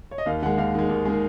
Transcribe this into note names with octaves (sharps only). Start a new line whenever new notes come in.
C#5
D#5
D#2 F5
D#3 G#3 F#5
D#2 F5
D#3 G#3
D#2
D#3 G#3